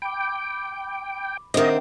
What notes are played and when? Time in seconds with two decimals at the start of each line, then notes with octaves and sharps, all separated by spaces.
0.02 G5 B5 D6
1.54 D#3 C4 D4 D#5 E5 F#5